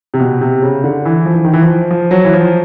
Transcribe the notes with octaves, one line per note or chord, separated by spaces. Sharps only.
C3
B2
C3
C#3
D3
E3
F3
E3
D#3
E3
F3
F3
F#3
E3
F3